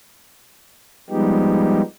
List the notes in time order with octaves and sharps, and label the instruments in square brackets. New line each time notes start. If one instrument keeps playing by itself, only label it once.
[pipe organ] F3 G3 G#3 B3 D#4 G4